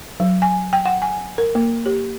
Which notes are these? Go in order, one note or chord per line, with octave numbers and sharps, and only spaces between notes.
F#3
G#5
G5
F#5
G#5
A#4
A#3
G4